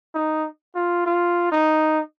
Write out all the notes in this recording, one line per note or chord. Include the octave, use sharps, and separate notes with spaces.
D#4
F4
F4
D#4